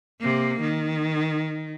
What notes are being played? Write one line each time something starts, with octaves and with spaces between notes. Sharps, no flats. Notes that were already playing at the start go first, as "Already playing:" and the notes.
C3 A#3
D#3